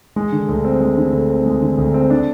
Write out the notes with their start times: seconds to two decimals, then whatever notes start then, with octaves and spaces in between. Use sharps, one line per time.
0.16 G#3
0.32 D3
0.49 D2
0.65 C4
0.81 G#3
0.97 D3
1.13 D2
1.30 C4
1.46 G#3
1.62 D3
1.78 D2
1.94 C4
2.10 D4